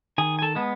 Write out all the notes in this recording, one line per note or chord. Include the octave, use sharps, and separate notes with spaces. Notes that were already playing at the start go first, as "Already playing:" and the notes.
D#3 G#4 G#5
G#5
A4 A5
G#3 B3